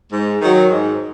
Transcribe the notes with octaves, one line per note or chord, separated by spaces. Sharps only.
G#2
D#3 F#3
G#2